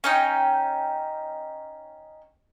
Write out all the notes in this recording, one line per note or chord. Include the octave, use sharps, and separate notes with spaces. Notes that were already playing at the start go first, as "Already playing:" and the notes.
C#4 D#4 G5